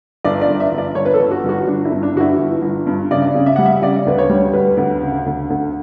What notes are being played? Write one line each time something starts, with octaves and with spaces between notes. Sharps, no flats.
G1 D5
D5
G1
E5
G1
D5
G1 C#5
B4
A4
G1
F#4
G1 F#4
G1 D4
E4
G2
D4
G1 F#4
E4
G1
G1
G2
C#3 D5
C#3
E5
G3 F#5
E5
C#3 D5
D2 B4
C#5
G3
D2 B4
D2
C#3
D2
D2